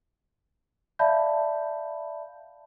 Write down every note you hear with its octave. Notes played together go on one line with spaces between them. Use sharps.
D5 E5 F5 A5 B5 G6